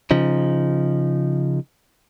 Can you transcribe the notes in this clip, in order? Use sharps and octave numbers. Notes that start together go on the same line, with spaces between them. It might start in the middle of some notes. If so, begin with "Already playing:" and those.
C#3 F3 D#4